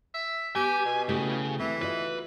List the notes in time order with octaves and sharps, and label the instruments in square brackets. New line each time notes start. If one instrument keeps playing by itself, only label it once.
[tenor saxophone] E5
[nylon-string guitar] B3 [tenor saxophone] G4 [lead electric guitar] G#5
[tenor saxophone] B2
[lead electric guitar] C#3 [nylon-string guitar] A3 E4 G4
[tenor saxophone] E3 [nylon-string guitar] C4
[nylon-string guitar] F4 F#4 D#5 [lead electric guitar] B4